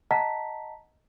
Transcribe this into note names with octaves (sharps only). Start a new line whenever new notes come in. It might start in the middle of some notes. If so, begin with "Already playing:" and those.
D#5 F#5 A5 A#5 B6